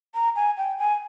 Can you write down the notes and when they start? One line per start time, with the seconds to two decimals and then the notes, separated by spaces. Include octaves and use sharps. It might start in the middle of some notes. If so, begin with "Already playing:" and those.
0.15 A#5
0.36 G#5
0.57 G5
0.79 G#5